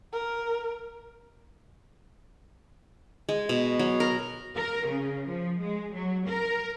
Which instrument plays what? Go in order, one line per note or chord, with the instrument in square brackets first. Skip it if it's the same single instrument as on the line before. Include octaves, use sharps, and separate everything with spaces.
[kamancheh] A#4
[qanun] G#3
B2
F#3
A#4
[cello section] A#4
C#3
F3
G#3
F#3
A#4